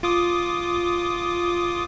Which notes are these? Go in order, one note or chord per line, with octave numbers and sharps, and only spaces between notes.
F4 D6 D#6